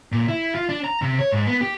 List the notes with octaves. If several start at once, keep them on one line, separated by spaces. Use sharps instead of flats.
A#2
E4
F4
D4
A#5
C3
C#5
G#2
B3
G4